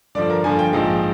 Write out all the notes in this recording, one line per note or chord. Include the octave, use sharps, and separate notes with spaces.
G2 D3 F3 D5
A#4
G2 D3 F3 G#5
G5
A#1 G#2 F3 G#3